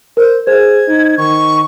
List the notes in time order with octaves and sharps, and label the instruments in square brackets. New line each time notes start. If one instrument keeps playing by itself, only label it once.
[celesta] A#4 [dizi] C5
[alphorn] G#4 [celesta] C5 [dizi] G#6
[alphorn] D#4
[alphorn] D#3 [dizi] C#6